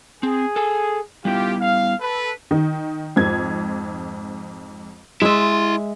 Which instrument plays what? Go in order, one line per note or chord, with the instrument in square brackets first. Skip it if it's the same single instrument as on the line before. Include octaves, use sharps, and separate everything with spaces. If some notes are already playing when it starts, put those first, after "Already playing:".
[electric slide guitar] C4 [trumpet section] G#4
[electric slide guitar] A4 G#5
[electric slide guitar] G3 B3 E4 [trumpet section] F4 G4
[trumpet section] F5
A4 B4
[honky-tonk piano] D#3
F2 G#2 G#6
[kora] G#3 E5 [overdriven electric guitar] E4 C6